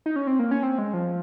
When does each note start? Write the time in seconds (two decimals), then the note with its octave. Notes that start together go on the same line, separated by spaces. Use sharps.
0.06 D#4
0.16 C#4
0.27 C4
0.39 A#3
0.51 C#4
0.63 C4
0.78 G#3
0.94 F3